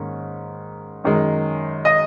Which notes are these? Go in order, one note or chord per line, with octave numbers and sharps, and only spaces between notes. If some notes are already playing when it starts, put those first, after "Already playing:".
Already playing: G#2 D#3 A#3 C#4
F#2 D#3 G#3
D#5